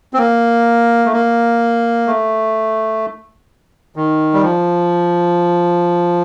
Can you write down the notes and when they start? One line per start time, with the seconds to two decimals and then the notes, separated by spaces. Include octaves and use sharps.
0.14 C4
0.18 A#3
1.05 A3
1.12 A#3
2.07 A3
3.96 D#3
4.34 G3
4.43 F3